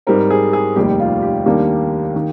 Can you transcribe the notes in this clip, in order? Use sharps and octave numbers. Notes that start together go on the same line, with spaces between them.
G#2 G3 C4 A#4
G#4
G#4
F1 D#2 D#3 G3 G4
F4
G4
D#2 D#3 G3 A#3 D4
D#3 A#3